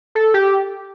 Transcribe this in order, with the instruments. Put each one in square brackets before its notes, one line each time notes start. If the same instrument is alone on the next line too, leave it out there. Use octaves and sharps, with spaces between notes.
[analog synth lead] A4
G4